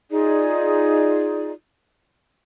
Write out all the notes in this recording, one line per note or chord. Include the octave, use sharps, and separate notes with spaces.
D#4 F4 G#4 D5